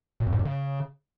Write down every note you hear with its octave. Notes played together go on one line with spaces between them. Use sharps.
A#2
F2
G#2
F#2
C#3